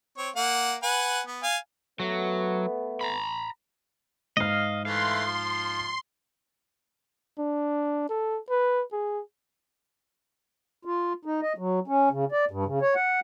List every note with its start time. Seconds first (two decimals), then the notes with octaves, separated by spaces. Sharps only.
0.18 C4 C#5
0.36 A#3 F#5
0.83 B4 F#5 G#5
1.27 B3
1.43 F5 G#5
2.00 F#3 A3 B3
3.01 A#5 B5
4.37 G#2 D#5 F5 F6
4.85 E3 A3 F5 C6
5.26 F3
7.38 D4
8.09 A4
8.49 B4
8.92 G#4
10.85 F4
11.25 D#4
11.42 D#5
11.58 F#3
11.88 C#4
12.11 C#3
12.32 D5
12.51 G2
12.65 C#3
12.82 C#5
12.95 F#5